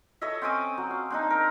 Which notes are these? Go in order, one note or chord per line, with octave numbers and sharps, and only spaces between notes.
A4 C#5 D#5 E5
C4 C#4 D6 D#6
F#3
F5
C4 D4 D#4
A#4